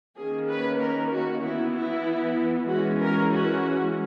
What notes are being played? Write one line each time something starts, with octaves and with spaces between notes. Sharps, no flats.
D#3 A#3 C#4 G#4
B4
A#4
F#4
E3 B3 E4
E4
E3 G#3 C#4 F#4
A#4
F#4